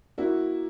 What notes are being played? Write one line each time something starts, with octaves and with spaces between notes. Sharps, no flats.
A#3 E4 F#4